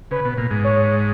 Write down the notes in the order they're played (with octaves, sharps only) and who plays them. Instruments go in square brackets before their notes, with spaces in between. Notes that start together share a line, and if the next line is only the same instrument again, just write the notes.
[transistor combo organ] C#3 [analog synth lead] B4
[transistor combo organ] B2
A#2
G#2
[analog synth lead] C#5